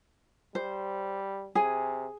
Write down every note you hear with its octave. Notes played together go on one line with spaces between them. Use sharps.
G3 C5
C3 G#4 G#5